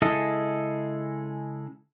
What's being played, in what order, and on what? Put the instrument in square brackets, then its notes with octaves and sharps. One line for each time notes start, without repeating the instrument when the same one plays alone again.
[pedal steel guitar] C#3 G#3 E4 A4 D#5